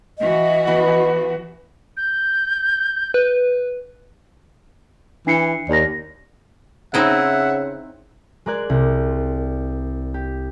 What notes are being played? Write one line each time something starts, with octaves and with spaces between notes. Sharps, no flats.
E3 F#4 D#5
B3 B4 F#5
G6
B4
E3 D4 C7 C#7
D#2 D5 A#6
C#3 C4 D#4 E4 E5 F#5
G#3 G#4 A#4 D5 F#6 G#6
C2
G4